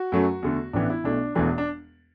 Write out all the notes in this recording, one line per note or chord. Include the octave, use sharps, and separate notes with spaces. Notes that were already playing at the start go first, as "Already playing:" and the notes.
Already playing: F#4
F#2 F#3 A3
E2 D3 A3
A1 A2 E3 B3 D4
E4
B1 B2 A3 D4
E1 E2 E3 A3 D4
D4